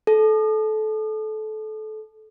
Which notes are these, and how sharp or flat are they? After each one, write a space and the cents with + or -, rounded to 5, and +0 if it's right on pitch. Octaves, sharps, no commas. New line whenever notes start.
A4 -25